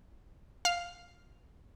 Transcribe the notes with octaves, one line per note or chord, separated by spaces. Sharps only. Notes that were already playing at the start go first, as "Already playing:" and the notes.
F5